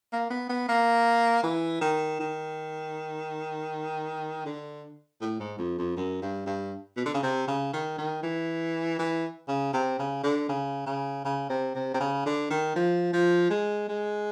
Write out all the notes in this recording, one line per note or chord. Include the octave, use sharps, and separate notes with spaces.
A#3
B3
B3
A#3
E3
D#3
D#3
D3
A2
G#2
F2
F2
F#2
G2
G2
B2
D3
C#3
C3
C#3
D#3
D#3
E3
E3
C#3
C3
C#3
D3
C#3
C#3
C#3
C3
C3
C3
C#3
D3
D#3
F3
F3
G#3
G#3